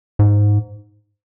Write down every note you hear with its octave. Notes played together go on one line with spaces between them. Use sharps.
G#2